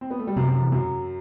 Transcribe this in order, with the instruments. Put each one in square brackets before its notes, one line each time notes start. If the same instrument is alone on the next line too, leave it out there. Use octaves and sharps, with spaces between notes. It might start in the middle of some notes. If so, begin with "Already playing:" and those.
[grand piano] C4
B3
A3
G3
[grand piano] F#2 F#3 [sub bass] C3
[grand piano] F#2 F#3
E2 E3
F#2 F#3